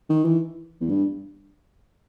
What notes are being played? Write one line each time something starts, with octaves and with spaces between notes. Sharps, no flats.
D#3
E3
E2
G2